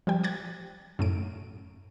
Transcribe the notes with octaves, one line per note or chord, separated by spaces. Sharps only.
F3 G3 G5
D6 F#6 G#6 A6
F#2 A2 D7